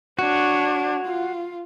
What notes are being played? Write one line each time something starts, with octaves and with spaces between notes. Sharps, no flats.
D4 F#4 C#5
F4